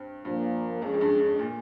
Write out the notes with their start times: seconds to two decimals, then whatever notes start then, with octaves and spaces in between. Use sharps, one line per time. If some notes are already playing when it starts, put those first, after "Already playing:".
Already playing: G2 C4
0.25 G2 A#2 F3 A#3
0.82 F2 G#3 C#4 G#4
0.94 F2
1.01 G2
1.20 G2
1.39 A#2